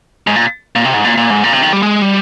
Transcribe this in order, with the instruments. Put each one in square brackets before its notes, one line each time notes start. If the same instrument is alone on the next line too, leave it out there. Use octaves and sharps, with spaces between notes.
[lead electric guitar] G#2
A#2
A#2
C3
G#2
A#2
A#2
G#2
A#2
C3
D#3
G3
G#3
G3